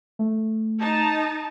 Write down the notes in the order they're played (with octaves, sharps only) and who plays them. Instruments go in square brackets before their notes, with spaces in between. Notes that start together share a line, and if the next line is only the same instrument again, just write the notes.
[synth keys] A3
[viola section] D#4 A5